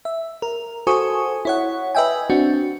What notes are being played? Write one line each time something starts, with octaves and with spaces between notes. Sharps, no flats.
E5
A#4
F#4 A4 C5 G#5 C#6 D#6
E4 C#5 F#5
B4 D#5 E5 G5 G#5
C4 D4 F#4